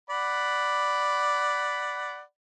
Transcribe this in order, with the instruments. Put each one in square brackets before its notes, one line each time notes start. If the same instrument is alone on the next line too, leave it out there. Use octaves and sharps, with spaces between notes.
[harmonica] D5 F#5 B5